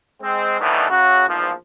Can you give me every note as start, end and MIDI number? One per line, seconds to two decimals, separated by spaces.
0.21 0.58 56
0.21 0.58 60
0.60 0.87 47
0.60 0.87 51
0.60 0.87 52
0.60 0.87 54
0.60 0.87 57
0.60 0.87 62
0.90 1.27 49
0.90 1.27 66
1.28 1.51 34
1.28 1.51 40
1.28 1.51 44
1.28 1.51 53